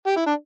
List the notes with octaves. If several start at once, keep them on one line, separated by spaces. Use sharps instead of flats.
G4
E4
D4